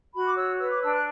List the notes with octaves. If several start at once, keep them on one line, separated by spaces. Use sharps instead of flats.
F#4 B5
D6
C#5 E6
B4 E6
D6
D4 E6
F#6